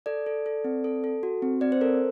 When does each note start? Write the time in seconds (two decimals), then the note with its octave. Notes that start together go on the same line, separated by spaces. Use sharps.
0.06 A4 D5
0.26 A4
0.46 A4
0.64 C4
0.84 A4
1.04 A4
1.23 F#4
1.42 C4
1.61 C4 D5
1.72 C5
1.81 A4 A#4